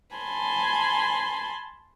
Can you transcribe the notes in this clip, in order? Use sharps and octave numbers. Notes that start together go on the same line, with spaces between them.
G#5 A5 B5 C6